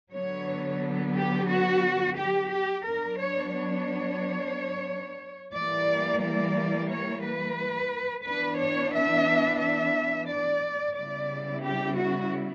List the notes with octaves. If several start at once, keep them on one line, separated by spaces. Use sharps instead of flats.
D3 F#3 B3 C#5
G4
F#4
G4
G4
F#3 B3 D4 A#4
C#5
C#5
E3 G3 A#3 D5
D5
C#5
B4
E3 B3 D4 B4
C#5
E5
E5
D5
C#3 G3 B3 E4 D5
G4
F#4